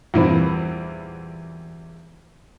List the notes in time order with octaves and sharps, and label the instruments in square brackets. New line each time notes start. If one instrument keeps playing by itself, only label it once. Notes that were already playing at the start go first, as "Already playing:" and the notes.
[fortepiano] E2 A#2 E3 G3 C4 E4